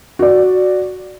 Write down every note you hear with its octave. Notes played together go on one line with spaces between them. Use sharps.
F#4 D5